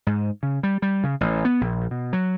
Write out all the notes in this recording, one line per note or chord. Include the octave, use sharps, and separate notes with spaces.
G#2
C#3
G3
G3
C#3
A1
B3
A#1
B2
F#3